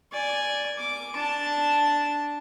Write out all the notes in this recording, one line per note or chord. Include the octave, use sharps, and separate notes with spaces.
D5 G#5
D6
D4 A5